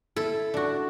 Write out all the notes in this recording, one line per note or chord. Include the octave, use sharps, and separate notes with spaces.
E4 A4
D4 F#4